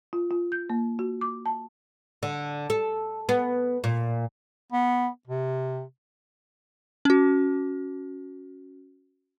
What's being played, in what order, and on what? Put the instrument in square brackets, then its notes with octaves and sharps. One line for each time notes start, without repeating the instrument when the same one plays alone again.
[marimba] F4
F4
G6
A#3
F#4
D6
A5
[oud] D3
A4
B3
A#2
[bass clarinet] B3
C3
[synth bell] C#4 F#4